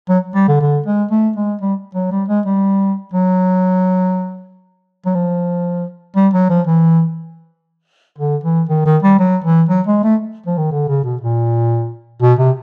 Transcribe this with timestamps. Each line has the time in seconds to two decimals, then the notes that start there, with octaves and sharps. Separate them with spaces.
0.09 F#3
0.34 G3
0.48 D3
0.61 D3
0.86 G#3
1.11 A3
1.36 G#3
1.61 G3
1.95 F#3
2.11 G3
2.28 G#3
2.46 G3
3.13 F#3
5.06 F#3
5.15 F3
6.16 G3
6.33 F#3
6.50 F3
6.67 E3
8.18 D3
8.44 E3
8.69 D#3
8.86 D#3
9.03 G3
9.19 F#3
9.44 E3
9.69 F#3
9.87 G#3
10.03 A3
10.46 F3
10.58 D#3
10.71 D3
10.88 C#3
11.04 B2
11.21 A#2
12.22 B2
12.39 C3